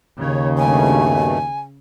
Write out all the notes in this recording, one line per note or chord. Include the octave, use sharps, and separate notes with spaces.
D#2 C#3 C#5
G2 B2 A3 G#5